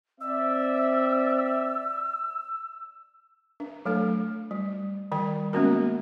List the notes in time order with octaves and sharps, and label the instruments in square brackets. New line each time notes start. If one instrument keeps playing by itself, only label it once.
[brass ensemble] C4 D5 E5 [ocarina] E6
[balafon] D4
F#3 A3 A4
G3
D#3 G3 G5
G#3 A#3 B3 C#4 F#4 A#4